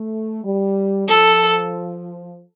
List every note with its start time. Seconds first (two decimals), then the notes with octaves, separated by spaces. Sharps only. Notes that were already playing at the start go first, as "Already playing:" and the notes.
Already playing: A3
0.44 G3
1.08 F3 A4